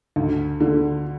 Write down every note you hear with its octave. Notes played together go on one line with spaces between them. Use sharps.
D2
D3